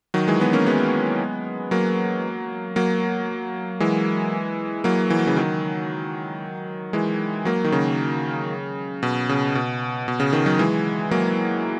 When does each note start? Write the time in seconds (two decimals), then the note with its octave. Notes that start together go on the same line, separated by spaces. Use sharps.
0.14 D#3 F#3
0.28 E3 G#3
0.41 G#3 B3
0.53 A#3 C#4
0.66 G#3 B3
1.71 F#3 A#3
2.76 F#3 A#3
3.80 E3 G#3
4.84 F#3 A#3
5.10 E3
5.19 F#3
5.27 C#3 E3
5.36 D#3 F#3
6.93 E3 G#3
7.45 F#3 A#3
7.64 D#3
7.72 C#3
9.03 B2
9.29 C#3
9.55 B2
10.08 B2
10.20 C#3
10.33 B2 D#3
10.46 D#3 F#3
10.59 E3 G#3
11.11 F#3 A#3